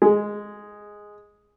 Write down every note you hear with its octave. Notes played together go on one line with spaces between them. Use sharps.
G#3